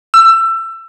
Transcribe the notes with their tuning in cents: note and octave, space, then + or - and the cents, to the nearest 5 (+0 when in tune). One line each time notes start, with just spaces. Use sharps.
E6 +25